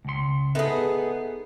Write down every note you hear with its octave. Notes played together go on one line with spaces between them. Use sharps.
C#2 C6
B3 D#4 G#4 A4 B4 E5